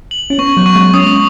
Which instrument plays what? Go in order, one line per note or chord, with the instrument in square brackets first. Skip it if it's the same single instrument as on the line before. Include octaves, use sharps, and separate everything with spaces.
[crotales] F#7
[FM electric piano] C#4
[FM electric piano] B3 [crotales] C#6
[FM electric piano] F#3
[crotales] C#6
[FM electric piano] G#3
[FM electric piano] C#4 [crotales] D#6